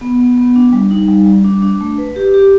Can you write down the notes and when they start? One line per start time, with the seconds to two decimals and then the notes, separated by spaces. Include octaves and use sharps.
0.01 B3
0.20 B3
0.38 B3
0.56 D4
0.73 G3
0.91 D#4
1.08 G3
1.26 G3
1.44 D4
1.62 D4
1.81 A3
1.98 B4
2.16 G4
2.34 G4